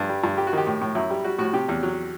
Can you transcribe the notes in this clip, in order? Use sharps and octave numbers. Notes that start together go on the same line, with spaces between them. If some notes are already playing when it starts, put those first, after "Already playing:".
Already playing: G2
G3
G2
G3 G4
F#4
D#3 G4
A2
A2
F#2 E4
G3
G3 F#4
A2 F#4
C3 G4
E2
F#3